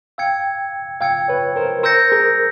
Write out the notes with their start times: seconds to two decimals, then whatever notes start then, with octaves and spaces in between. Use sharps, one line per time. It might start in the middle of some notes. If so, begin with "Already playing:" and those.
0.18 F5 G5 E6 G#6 C#7
1.01 F5 G5 E6 G#6 C#7
1.28 B4 C#5
1.56 A#4 C5
1.83 A#4 C5 E6 G6 A#6 C#7
2.12 G#4 A#4